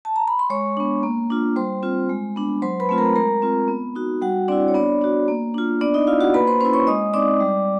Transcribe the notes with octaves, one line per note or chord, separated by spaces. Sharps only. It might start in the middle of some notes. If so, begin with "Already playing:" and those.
A5
A#5
B5
C6
G#3 C#5 C#6
B3 D4
A#3
D4 F4
G3 C5 C6
C4 F4
G#3
B3 D4
F#3 C5 C6
B4 B5
A3 C4 F4
A#4 A#5
G#3 A#4 A#5
C4 F4
B3
D#4 F#4
G3 F#4 F#5
C4 D4 E4 D5
C#5
B3 D4 D5
D4 F#4
A#3
D4 F4
B3 D4 D5
D#4 D#5
E4 F4 F5
F#4 F#5
A#3 B4 B5
C5 C6
C#4 E4 C5 C6
C#5 C#6
G#3 D#5 D#6
C4 D#4 D5 D6
G3